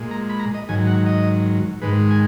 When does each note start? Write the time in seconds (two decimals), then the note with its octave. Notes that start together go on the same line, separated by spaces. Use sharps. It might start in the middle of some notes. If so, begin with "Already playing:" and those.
Already playing: A#2 G#3
0.11 A#5
0.30 B5
0.39 A#5
0.54 D#5
0.69 G#2 D#3 F#3 G#5
0.87 F#5
1.06 D#5
1.82 G#2 D#3 G#3 B4
2.11 G#5